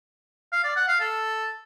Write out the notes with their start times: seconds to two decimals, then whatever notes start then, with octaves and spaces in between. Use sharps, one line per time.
0.52 F5
0.64 D5
0.76 F#5
0.88 F5
1.00 A4